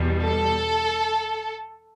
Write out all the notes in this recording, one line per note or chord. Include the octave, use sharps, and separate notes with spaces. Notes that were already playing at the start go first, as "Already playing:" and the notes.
Already playing: E2 B2 G3
A4